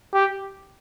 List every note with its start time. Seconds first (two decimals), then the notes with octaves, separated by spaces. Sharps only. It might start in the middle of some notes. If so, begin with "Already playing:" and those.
0.14 G4